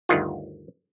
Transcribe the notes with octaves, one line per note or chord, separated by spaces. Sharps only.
G1 D2 D#3 F4